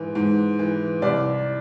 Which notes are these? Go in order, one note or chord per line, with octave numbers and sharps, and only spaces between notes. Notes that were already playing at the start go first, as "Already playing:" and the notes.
Already playing: G#2 E3
G#2
E3
C2 D5